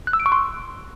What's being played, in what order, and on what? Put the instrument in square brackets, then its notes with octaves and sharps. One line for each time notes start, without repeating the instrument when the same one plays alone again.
[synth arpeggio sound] F#6
E6
D7
C#6
C6